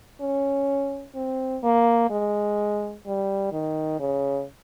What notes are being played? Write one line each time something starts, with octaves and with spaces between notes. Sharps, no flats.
C#4
C4
A#3
G#3
G3
D#3
C#3